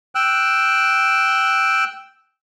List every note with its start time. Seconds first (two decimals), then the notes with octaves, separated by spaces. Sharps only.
0.15 G5 E6 F#6